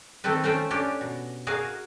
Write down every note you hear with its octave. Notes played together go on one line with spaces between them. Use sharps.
D#3 A3 C4 A4 B4
A3 C#4 F4 C5 G5
C#4 D4 G4
B2
F#4 G#4 A#4 F5